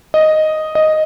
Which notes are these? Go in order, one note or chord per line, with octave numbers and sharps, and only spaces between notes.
D#5
D#5